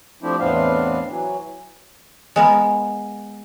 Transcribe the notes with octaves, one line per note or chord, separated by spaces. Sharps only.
F3 A3 C4 D4 E4 G4
E2 A2 B3 C4 D4 F5
E3 F#3
G#3 B3 A#4